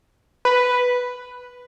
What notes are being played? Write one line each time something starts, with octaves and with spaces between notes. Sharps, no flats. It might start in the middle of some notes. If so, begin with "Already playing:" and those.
B4